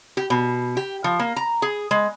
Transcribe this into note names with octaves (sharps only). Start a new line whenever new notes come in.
G4
B2
G4
F3
A#3
A#5
G#4
G#3